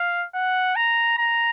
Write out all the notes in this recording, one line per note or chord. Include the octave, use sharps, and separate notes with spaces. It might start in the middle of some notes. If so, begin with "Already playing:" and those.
Already playing: F5
F#5
A#5
A#5